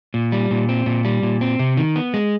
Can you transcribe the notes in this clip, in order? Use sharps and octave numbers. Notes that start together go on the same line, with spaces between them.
A#2
G3
A#2
C4
A#2
G3
A#2
C4
C3
D#3
B3
G#3